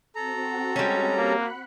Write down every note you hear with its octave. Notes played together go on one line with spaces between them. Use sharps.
C4 F#4 A4 A#5
G3 G#3 C#4
A#3 F#5 B5 F#6